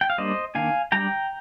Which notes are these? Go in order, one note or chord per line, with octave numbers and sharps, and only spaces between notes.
G5
F5
G3 A#3 D4 C5 D#5
D#3 A#3 D4 F5 G#5
G3 D4 G5 A#5